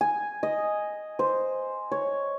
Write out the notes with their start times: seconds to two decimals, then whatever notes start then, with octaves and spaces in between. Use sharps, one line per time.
0.01 G#5
0.43 D#5
1.19 C5
1.92 C#5